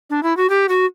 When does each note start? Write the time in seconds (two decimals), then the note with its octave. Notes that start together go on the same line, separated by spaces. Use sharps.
0.10 D4
0.23 E4
0.37 F#4
0.49 G4
0.69 F#4